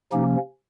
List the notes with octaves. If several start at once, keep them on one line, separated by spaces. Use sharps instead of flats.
C3 F3 A#3 C#4 D#4 G4